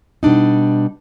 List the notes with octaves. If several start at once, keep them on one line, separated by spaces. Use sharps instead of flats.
B2 G3 D4 D#4